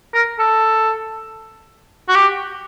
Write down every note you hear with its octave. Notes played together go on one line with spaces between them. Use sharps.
A#4
A4
F#4
G4